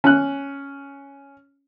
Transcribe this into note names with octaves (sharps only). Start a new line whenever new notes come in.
C#4 F#6